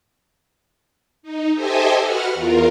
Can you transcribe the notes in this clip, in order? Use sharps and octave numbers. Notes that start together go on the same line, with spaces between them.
D#4
G4 A4 C5 D#5 E5 G#5
F#4 B4 F#5 F6
E2 F4 A#4